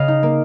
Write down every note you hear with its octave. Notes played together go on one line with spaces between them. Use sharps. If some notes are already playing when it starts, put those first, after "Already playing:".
Already playing: C#3 D#5 F5
D#4
A#3